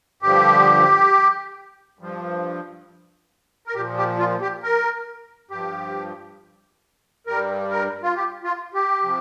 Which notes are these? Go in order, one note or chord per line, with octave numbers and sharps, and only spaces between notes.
G2 D3 F3 G4
G2 F3
A#4
A#2 F3 G4
G4
F4
G4
A#4
G2 F3 G4
G2 G3 A#4
A#4
F4
G4
F4
G4
C3 F3